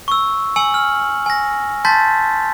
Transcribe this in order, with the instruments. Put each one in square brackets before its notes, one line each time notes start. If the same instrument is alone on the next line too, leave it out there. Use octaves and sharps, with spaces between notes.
[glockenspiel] C#6 E6
G#5 E6 C#7 F#7
F6
G#5 A#6
A5 C6 G6 A6 B6